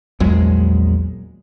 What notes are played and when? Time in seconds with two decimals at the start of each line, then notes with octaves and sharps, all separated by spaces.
0.20 A#1 E2 F#3 G#3